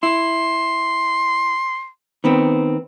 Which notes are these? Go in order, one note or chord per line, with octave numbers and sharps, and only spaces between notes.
E4 C6
D#3 B3 C4